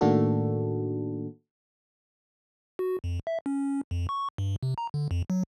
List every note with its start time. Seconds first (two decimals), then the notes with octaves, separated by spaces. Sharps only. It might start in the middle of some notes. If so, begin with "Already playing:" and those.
0.01 A2 D#3 A#3 D4 F#4 A4
2.79 F#4
3.04 F2
3.27 E5
3.46 C#4
3.91 F2
4.09 C#6
4.38 G2
4.63 C3
4.78 A#5
4.94 D3
5.11 F2
5.30 F#3